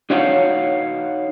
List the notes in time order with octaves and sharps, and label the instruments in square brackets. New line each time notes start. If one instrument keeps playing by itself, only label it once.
[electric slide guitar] D#4 F#4 C#5 F5 F#5